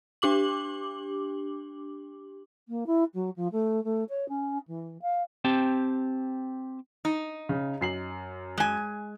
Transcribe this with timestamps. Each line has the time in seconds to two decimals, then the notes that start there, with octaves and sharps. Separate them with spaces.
0.22 D4 G4 D6 F#7
2.68 A#3
2.86 E4
3.14 F#3
3.36 F3
3.52 A3
3.84 A3
4.09 C#5
4.29 C#4
4.67 E3
5.02 F5
5.45 C4 G4 A5
7.05 D#4
7.49 C#3
7.81 F#2 C7 F#7
8.57 G#3 G#5